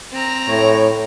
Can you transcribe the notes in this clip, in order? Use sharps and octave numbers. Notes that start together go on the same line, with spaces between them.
C4 A#5
A2 C#5